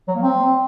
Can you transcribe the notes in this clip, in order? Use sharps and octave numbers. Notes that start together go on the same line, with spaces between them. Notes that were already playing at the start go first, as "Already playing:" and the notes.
F#3
A#3
C4